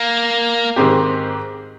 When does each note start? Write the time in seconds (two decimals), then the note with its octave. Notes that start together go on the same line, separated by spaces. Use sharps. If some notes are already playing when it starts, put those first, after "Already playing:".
Already playing: A#3
0.76 G#2 D#3 G#3 C4 G4